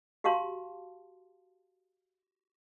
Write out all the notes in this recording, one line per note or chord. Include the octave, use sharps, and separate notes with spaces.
F#4 G4 F5 A5 C6